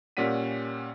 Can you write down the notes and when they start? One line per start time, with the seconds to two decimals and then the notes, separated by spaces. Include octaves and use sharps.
0.17 A#2 G3 C#4 F#5 B6 D#7